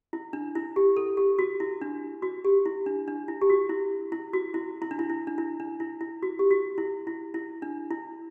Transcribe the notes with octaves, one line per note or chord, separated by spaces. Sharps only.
E4
D4
E4
G4
A4
G4
F#4
E4
D4
F#4
G4
E4
D4
D4
E4
G4
F#4
E4
E4
F#4
E4
E4
D4
E4
E4
D4
E4
D4
E4
E4
F#4
G4
F#4
E4
E4
E4
D4
E4